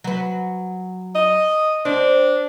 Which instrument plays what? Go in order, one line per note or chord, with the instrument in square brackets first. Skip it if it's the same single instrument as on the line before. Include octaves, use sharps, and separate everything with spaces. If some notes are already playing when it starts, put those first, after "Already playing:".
[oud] F#3 B4
[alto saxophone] D#5
[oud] C4 [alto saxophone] D4